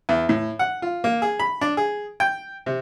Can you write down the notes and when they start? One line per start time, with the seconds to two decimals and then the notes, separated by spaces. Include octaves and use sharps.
0.09 E2
0.29 A2
0.59 F#5
0.82 F4
1.04 A#3
1.22 G#4
1.39 B5
1.61 D4
1.77 G#4
2.20 G5
2.66 C3